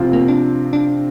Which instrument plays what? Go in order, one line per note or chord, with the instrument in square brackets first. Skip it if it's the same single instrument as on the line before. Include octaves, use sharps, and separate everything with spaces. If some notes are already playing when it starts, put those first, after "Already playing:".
Already playing: [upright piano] C3 F3 C4 F4
[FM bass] A#3
D4
D4